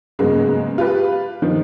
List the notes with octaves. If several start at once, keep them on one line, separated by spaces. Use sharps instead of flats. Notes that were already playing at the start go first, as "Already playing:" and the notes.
G#2 C#3 F#3 G#3 A#3 B3
F4 G4 B4
D#3 F3